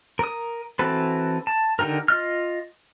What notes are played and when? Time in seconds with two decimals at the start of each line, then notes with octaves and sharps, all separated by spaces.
0.19 A#4 D#6
0.79 E3 C4 F#4 A4 B4
1.47 A5
1.79 D3 D#4 F4 G4 A#4
2.08 F4 D#5 F6